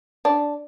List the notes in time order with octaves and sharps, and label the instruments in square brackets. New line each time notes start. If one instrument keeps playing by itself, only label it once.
[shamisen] D4